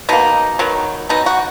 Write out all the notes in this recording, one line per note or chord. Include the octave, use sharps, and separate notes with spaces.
B2 A#3 D#4
D#3 F#3 B3
B2 F#3 B3 D#4
F#4